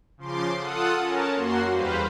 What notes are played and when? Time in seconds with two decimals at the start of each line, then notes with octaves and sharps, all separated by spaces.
0.17 C#3 F3 C6 D6
0.57 F4 A4 F#5 D#6
0.99 C#4 A#4 A5
1.35 F#2 A#3 F#4 C6
1.70 E2 G3 B4 C5 F5